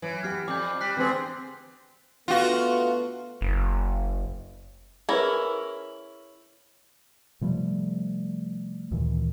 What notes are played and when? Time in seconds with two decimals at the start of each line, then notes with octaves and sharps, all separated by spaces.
0.02 E3 F#3
0.23 B3 G4 F#5 F6 C7
0.48 F2 D5 D6 G6
0.81 G3 F#6 B6 C7
0.97 D3 E3 A3 C4 G#4 G#5
2.28 D3 A3 B3 F4 F#4
3.41 F#1
5.09 C#4 E4 G#4 A#4 B4
7.41 C3 F3 G3 A3
8.91 D2 A#2 D#3 E3